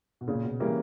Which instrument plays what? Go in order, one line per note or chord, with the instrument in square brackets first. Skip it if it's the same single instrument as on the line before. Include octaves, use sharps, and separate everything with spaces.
[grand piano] B2
[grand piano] A#2 [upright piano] C#3
[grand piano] B2
[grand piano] C#3 [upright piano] E3 G3 A#3 C#4